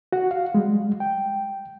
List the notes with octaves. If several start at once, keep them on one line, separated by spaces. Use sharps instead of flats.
F#4 F#5
F5
G3 G#3
G5